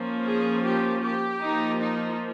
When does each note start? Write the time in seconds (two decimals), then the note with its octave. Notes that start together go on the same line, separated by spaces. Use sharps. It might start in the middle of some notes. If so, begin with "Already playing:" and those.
Already playing: F3 A#3 C#4
0.26 G#4
0.64 G4
1.02 G4
1.41 F3 A#3 D#4
1.80 D#4